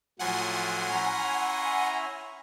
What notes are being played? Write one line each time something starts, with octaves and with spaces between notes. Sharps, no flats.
A2 F3 F#3 F#5 G#5 C6
C#4 E4 E5 A#5